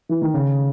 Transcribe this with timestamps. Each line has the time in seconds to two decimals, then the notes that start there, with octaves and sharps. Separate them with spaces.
0.09 E3
0.22 D#3
0.34 C#3